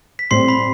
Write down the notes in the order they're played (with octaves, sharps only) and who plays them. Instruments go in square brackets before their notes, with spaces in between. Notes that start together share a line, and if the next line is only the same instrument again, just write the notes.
[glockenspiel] B6
[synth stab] A2 G3 C4 [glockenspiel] C6 C7
[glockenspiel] B5 B6